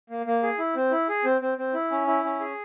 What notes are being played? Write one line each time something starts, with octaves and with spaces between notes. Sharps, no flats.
A#3
A#3
G#4
E4
C4
E4
G#4
C4
C4
C4
E4
C#4
E4
C#4
G#4